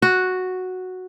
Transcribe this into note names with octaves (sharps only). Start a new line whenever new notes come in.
F#4